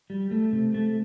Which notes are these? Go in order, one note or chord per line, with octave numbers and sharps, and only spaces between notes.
G3
A3
C3
A3